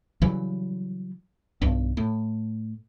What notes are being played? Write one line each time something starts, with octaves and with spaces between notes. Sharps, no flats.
C#3 E3 F#3 G3
B1 G2
A2